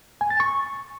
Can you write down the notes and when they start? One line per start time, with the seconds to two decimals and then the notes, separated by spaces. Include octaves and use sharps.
0.21 G#5
0.30 A6
0.40 C#6